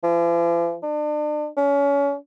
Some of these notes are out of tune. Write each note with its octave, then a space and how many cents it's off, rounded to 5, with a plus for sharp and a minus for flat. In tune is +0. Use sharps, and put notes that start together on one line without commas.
F3 -45
D4 +35
C#4 +30